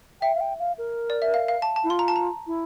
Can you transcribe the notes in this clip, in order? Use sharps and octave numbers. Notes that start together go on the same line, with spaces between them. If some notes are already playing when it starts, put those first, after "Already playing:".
E5 G5
F5
G5
F5
A#4
D5
E5
F5
F5
A5
A5
E4
F4 C6
A#5
A5
A#5
E4